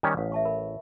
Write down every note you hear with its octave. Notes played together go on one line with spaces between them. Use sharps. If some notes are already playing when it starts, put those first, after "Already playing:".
D#3 G3 C#4
A1 B4 F5
E5 A5 C#6
A#4 E5 B5